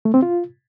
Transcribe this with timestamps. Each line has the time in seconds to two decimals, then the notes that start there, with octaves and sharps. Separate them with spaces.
0.05 A3
0.14 C4
0.22 F4